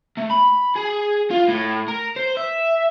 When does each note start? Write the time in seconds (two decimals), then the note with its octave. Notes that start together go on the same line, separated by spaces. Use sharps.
0.18 A3
0.31 B5
0.76 G#4
1.31 F4
1.48 A2
1.88 A#4
2.16 C5
2.37 E5